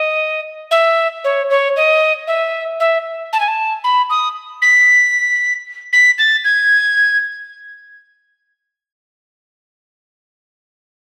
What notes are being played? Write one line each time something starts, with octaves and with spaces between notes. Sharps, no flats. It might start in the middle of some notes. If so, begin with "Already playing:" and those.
Already playing: D#5
E5
C#5
C#5
D#5
E5
E5
A5
G#5
A5
B5
D#6
B6
B6
A6
G#6